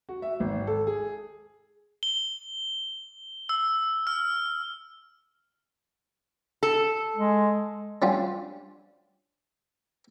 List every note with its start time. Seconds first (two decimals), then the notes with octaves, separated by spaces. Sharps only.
0.09 F#4
0.22 E5
0.40 G#1
0.67 A4
0.87 G#4
2.03 G7
3.49 E6
4.07 F6
6.63 A4
7.17 G#3
8.02 G3 C#4 D4 F4 F#4